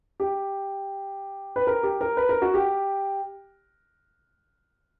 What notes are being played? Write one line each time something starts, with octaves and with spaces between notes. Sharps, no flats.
G4
B4
A#4
G4
A#4
B4
A#4
F#4
G4